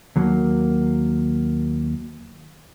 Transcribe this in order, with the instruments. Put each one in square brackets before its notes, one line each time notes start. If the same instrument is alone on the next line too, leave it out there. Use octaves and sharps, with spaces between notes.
[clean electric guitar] D#2 F#3 A#3